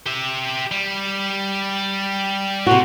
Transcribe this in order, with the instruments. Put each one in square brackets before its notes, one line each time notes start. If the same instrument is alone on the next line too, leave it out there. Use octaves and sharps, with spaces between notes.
[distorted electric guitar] G4 E5
G3
[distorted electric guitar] A2 [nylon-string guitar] C3 F#4